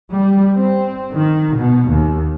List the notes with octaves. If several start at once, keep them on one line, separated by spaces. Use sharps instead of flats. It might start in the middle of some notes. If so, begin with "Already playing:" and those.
G3
C4
D#3
B2
D#2